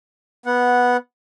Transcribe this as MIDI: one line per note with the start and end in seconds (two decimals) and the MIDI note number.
0.46 0.97 59
0.46 0.97 78